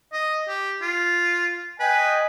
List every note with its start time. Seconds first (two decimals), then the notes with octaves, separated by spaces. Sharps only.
0.13 D#5
0.48 G4
0.82 F4
1.80 B4 D#5 G5 G#5